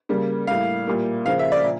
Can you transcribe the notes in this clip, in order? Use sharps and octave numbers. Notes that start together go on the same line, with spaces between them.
C#3 G3 A#3
A2 G3 A#3 F5
A#2 G3 A#3
C#3 F3 A#3 F5
E5
D5
A#2